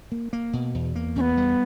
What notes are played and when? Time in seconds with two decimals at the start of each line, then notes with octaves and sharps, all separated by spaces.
0.12 A#3
0.33 A#3
0.53 B2
0.74 E2
0.96 A#3
1.16 E2 C#4
1.21 B3
1.37 G3